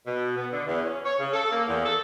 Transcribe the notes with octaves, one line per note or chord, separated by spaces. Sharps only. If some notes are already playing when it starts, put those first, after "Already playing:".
B2
B3
D3
E2
C#4
C#5
C#3
A4
A#3
E2
A4